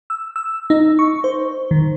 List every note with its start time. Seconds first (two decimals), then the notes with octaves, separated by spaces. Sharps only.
0.10 E6
0.36 E6
0.70 D#4
0.99 C#6
1.24 C5
1.71 D#3